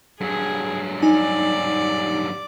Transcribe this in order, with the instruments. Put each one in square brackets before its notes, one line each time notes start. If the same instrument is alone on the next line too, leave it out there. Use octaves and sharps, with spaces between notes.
[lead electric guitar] G2 F#3 [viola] G#4
[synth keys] D#4 G#5 [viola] D5